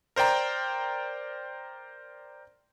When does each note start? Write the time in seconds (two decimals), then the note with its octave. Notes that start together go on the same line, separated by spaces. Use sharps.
0.16 A#4 C5 D5 G5 A#5